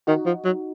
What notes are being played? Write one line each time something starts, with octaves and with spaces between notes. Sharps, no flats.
D#3 D#4 F#4
F3
F#3